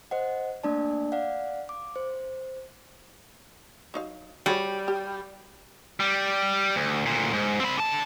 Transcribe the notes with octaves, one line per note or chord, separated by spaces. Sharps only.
C5 D#5 F#5
A3 A#3 D4 D5 A5
D5 F5 F#5
D6
C5
F#3 D#4 F5
G3 F#4 G#4 C#5
G4
G3
D2
D2 A#2
G#2
C4 B5
D3 A5